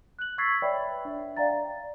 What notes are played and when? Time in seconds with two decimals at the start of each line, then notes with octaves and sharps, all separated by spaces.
0.19 F#6 F#7
0.38 C#6 E6 G#6 A6 B6 C7
0.62 B4 C#5 D5 E5 G5 B5
1.05 D4 E5
1.36 D5 F5 G5 A#5 A6
1.50 D5